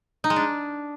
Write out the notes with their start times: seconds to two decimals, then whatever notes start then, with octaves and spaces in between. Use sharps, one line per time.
0.24 D#4
0.30 G#3
0.36 D4